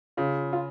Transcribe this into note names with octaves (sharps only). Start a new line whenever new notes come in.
C#3 F4
F4